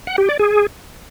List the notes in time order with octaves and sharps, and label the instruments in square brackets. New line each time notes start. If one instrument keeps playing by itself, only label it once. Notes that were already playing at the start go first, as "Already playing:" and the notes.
[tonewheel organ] F#5
G4
D5
G#4